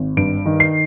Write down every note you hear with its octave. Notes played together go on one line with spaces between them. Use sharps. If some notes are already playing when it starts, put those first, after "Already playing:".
Already playing: G#1
G2 D7
D#3
C7